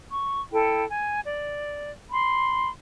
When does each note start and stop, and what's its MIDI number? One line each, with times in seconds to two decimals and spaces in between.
0.10 0.41 85
0.52 0.84 64
0.52 0.84 69
0.52 0.84 79
0.89 1.20 80
1.24 1.90 74
2.11 2.69 83
2.11 2.69 84